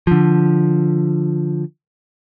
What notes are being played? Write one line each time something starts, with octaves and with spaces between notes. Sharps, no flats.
D3 F3